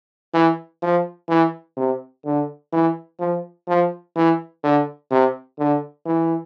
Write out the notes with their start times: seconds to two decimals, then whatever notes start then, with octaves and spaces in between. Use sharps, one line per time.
0.34 E3
0.82 F3
1.29 E3
1.77 C3
2.25 D3
2.73 E3
3.20 F3
3.68 F3
4.16 E3
4.63 D3
5.11 C3
5.59 D3
6.06 E3